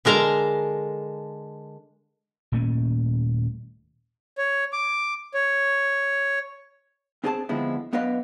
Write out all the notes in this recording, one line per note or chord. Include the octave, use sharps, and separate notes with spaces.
D3 G#3 A#4 A5 A#5
D#1 A#2 A3 C#4
C#5
D6
C#5
C4 D4 G#4 C5 G#5 A5
D3 F3 G#3 B3 C4 E4
F#2 B3 D4 B4 D#5 F5